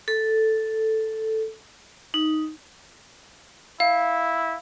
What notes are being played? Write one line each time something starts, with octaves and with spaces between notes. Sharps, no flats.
A4
D#4
E4 F5